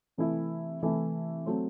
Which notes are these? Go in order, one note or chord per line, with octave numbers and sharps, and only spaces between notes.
C3 E3 A3 E4
C3 E3 A3 E4
F#3 A3 C4